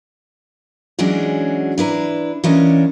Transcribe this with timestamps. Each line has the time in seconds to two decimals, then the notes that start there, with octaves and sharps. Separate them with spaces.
0.99 E3 F#3 G#3 C#4 D4 F#4
1.78 D4 E4 B4 A#5
2.44 E3 A#3 C#4 D4 C#5 D#5